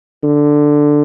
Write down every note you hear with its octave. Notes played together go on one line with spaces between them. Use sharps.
D3